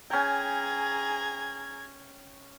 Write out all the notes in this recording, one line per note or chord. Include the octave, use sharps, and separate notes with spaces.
C#4 G#4 G5 A#5 G#6